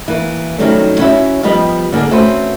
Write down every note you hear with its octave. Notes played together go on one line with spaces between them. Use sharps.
E3 A#3
D#3 F#3 G3 A3 C4 C#4
C#4 E4 F#4 C#5 E5
F3 G3 B3 G4 B4 D#5
D3 A#3 D4 G#4
A3 C4 C#4 F#4 B4 C5